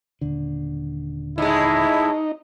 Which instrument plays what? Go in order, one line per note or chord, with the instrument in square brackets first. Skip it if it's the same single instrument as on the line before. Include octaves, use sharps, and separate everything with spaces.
[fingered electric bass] D#1 D3
[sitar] A2 G#3 [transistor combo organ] D#4 [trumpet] E4